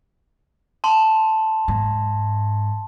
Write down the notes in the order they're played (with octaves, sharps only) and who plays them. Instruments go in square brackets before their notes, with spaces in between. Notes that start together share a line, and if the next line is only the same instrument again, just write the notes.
[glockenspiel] A5 C6
[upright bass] G#2